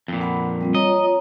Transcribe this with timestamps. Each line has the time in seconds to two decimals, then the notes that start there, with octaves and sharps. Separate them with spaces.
0.08 F2 A#2
0.21 F#5 B5
0.61 G3 C4 F4
0.75 F4 C#5 D#5 A#5